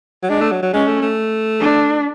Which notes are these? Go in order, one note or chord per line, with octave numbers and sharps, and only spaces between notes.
F#3
G#3 D4
A3
F#3
F#3
G#3 C#4
A3
A3
D4